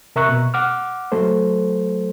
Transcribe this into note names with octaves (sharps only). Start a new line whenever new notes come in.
C3 A#4 E5 A#5 C#6 F#6
B2
F#5 D6 F6
F#3 A3 A4 C5